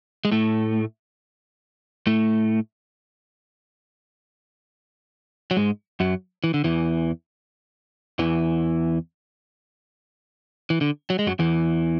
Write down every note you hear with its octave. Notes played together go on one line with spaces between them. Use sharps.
G#3
A2 A3
A2 A3
F#3
G#2 G#3
F#2 F#3
E3
D3
E2 E3
E2 E3
E3
D3
F#3
G#3
F#2 F#3
E2 E3